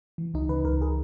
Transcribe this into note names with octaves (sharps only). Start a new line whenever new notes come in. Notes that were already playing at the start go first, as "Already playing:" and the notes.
E3
C#2 D#4
C#3 B4
C#2 A#4
G#4